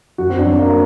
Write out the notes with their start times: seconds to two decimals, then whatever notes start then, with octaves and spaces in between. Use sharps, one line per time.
0.18 F#2 F#4
0.30 C4
0.39 D4
0.46 F#3
0.59 A#3